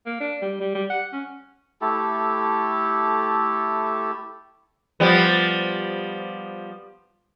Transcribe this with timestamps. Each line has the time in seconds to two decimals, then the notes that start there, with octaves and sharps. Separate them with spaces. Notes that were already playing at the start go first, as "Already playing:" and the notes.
0.06 A#3
0.20 D4
0.42 G3
0.60 G3
0.74 G3
0.90 F#5
1.12 C#4
1.81 A3 E4 G4 A4
5.00 F3 G3 B3